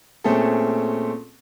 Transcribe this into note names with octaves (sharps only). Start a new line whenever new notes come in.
A#2 A3 C4 C#4 G#4 A4